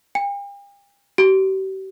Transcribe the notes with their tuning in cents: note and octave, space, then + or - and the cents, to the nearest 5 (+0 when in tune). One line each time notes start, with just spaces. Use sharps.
G5 +45
G4 -40